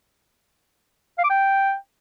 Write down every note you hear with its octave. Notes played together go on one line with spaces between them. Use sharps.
F5
D6
G5